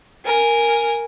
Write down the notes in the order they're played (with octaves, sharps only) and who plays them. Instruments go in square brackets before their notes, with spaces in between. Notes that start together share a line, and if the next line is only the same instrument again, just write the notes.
[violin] A#4 G#5